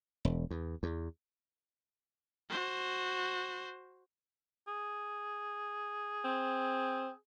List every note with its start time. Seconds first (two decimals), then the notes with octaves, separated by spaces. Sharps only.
0.25 E1
0.51 E2
0.83 E2
2.50 F#4 C5
4.68 G#4
6.25 C4